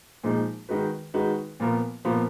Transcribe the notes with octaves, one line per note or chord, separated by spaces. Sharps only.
A#2 F3 G#3 D#4
D#3 G#3 D#4 F#4 B4
D#3 G#3 D#4 F#4 B4
A#2 F3 B3 F4 A#4
A#2 F3 B3 F4 A#4